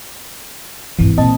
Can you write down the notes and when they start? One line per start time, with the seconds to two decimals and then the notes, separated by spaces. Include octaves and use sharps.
0.99 G#1 G2 E3
1.17 A#2 C4 D#5 A5